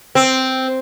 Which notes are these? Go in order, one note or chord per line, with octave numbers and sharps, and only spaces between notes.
C4